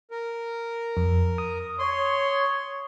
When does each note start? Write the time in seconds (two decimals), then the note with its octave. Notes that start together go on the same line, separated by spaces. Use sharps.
0.11 A#4
0.97 F2
1.38 D#6
1.79 C#5 C6